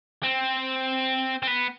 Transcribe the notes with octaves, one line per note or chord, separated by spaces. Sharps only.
C4
C4
B3